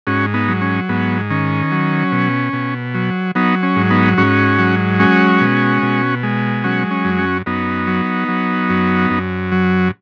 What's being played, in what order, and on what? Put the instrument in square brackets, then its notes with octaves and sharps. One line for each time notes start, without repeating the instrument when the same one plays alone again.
[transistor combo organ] G#2 C#4 F#4
B3 D#4
F#3
C#4
G#2 B3
D#3 C#4
F#3
B2
B2
F#3
F#3 B3 D#4
C#4
G#2
B3 D#4
G#2 C#4 F#4
F#3
G#3 C#4 F#4
B2
B2
G#3
F#3 C#4 F#4
C#4
F#2
C#4 F#4
F#2 B3 D#4
F#3
F#3
F#2
F#2
F#3